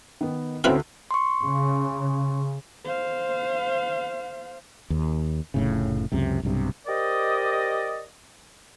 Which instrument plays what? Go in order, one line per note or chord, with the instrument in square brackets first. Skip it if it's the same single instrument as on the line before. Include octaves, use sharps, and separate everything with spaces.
[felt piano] D#3 B3
[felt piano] D2 A3 F#4 [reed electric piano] C4 C#4 [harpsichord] E4 B4 F5
[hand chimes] C6 C#6
[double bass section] C#3
[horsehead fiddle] C5 F5
[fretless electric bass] D#2
F1 A2 C#3
C#2 F#2 C3
B1 G2 C3
[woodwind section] G4 A#4 C5 D5 D#5